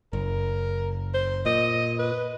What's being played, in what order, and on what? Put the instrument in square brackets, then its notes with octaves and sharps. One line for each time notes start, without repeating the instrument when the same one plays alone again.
[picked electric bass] F#1 [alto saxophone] A#4
[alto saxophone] C5
[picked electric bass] A#2 [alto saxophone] D#5
[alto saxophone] B4